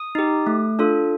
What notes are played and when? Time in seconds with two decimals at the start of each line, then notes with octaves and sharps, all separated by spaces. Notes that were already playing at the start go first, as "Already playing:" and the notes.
Already playing: D#6
0.15 D#4 G4
0.47 A3
0.79 D4 F4 A4